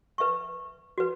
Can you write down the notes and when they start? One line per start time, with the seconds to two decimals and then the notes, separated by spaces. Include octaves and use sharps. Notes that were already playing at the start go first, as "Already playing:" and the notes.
0.18 B4 E5 C#6
0.98 F#4 B4